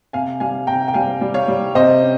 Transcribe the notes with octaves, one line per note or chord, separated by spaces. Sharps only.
C3 F5 G#5
G3 F5 G#5
C3 G5 A#5
G5
G3 F5 G#5
G3
C#5 F5
G3
C3 C5 D#5
C#4